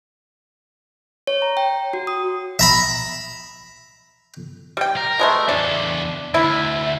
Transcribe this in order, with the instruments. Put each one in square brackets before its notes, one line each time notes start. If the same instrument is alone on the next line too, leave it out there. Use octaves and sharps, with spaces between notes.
[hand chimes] C#5
A#5
G5
F#4
D#6
[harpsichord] E5 A#5 B5
[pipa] G3 G5
[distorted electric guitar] A#4
[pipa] B2 G#3 A3
[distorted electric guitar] E2 A4 [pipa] D4
[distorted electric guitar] D2 [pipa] E4